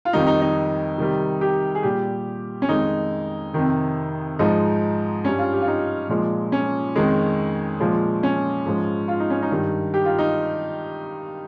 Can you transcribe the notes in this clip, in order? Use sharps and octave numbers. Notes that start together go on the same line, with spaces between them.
F4
F2 D#3 G3 D#4
D#4
D#4
C3 D#3 G3
G4
G#4
A#2 G3 G4
C#4
F2 D#3 G#3 D#4
F2 C3 D#3
G#2 F3 G#3 D#4
G2 G3 C#4
F4
G4
F4
D#4
A#2 F3 G#3
C#4
F2 D#3 G#3
A#2 F3 G#3
C#4
G#2 F3 G#3
F4
D#4
C#4
D#4
G2 D#3 G3
G4
F4
D#4